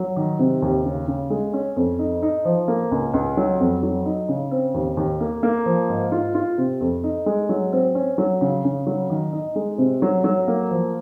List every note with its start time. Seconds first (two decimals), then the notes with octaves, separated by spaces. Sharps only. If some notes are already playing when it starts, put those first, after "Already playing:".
Already playing: F#3
0.16 D#3
0.39 C3
0.62 D#2
0.85 C#3
1.07 C#3
1.30 G#3
1.53 C#4
1.76 F2
1.99 D#4
2.22 D#4
2.45 F3
2.68 A#3
2.91 C#2
3.14 C#2
3.37 F#3
3.60 F2
3.83 F#3
4.06 D#4
4.29 C#3
4.51 C4
4.74 D#2
4.97 D#2
5.20 A#3
5.43 A#3
5.66 F3
5.89 G#2
6.12 F4
6.35 F4
6.58 C3
6.81 F2
7.04 D#4
7.26 G#3
7.49 F#3
7.73 C4
7.95 C#4
8.18 F#3
8.41 C#3
8.64 C#3
8.87 F#3
9.10 D#3
9.33 D#4
9.56 G#3
9.78 C3
10.02 F#3
10.24 F#3
10.48 A#3
10.71 F3